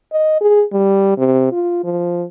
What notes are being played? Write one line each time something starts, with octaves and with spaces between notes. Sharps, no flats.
D#5
G#4
G3
C3
F4
F3